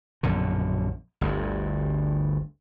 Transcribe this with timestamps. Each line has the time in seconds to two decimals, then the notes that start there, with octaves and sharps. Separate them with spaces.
0.23 A#1 F#2 B2 D3
1.21 G1 D2 G2